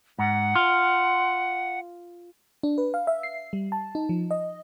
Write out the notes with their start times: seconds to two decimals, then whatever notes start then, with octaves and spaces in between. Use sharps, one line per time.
0.19 G#2 F#5
0.55 F4
2.63 D4
2.78 B4
2.94 F5
3.07 E5
3.23 C7
3.53 G3
3.72 A5
3.95 D#4
4.09 F3
4.31 D#5